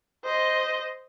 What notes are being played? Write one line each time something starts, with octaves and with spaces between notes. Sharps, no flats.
C5 D#5